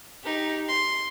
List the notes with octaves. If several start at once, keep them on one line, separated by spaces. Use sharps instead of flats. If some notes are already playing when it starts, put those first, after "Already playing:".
D#4 G4
C6